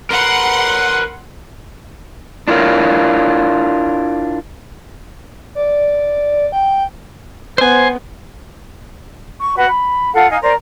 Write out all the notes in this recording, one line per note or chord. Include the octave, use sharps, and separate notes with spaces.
A#4 B4 F#5 C6
D4 E4 F4 A#4 C#5
D5
G5
B3 C5 G#5
C#6
F#4 B4
B5
F4 A4 F5 F#5
D#4 D#5 F5 G#5
A#4 C5 D5